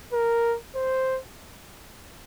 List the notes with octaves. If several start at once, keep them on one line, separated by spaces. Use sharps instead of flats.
A#4
C5